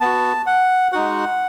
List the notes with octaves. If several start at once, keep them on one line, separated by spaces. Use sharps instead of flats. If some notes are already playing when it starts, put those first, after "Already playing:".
B3 F#4 A5
F#5
G#3 D#4 F#4 F#5